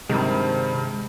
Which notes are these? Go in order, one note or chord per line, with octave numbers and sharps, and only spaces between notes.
G2 C3 D#3 G#3